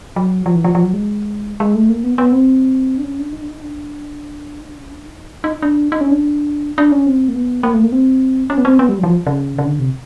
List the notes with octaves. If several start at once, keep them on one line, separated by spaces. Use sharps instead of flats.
F#3
F3
E3
F3
F3
F#3
G#3
G#3
A3
A#3
B3
B3
C4
D4
C#4
D4
D#4
D4
D#4
D4
D#4
D4
C#4
D4
D#4
D#4
D4
D#4
C#4
D4
D4
C#4
C4
A#3
B3
A#3
A3
A#3
C4
C#4
B3
C4
B3
G3
F#3
E3
F3
C#3
C#3
D3
C3